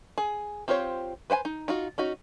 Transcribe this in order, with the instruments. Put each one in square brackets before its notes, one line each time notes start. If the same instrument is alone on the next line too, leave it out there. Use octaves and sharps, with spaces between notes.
[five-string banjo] G#4
C4 F4 G4 C5 C#5
B4 C5 F#5 G#5
D#4
D#4 F4 F#4
C#4 D#4 F#4